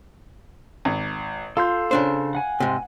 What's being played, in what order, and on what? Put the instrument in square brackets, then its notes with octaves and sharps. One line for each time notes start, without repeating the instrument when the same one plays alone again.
[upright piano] G#1
[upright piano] F4 [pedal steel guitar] A4 C6 G6
[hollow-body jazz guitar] C#3 D4 C5
[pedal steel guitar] F#5 G#5
[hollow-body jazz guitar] G#2 C3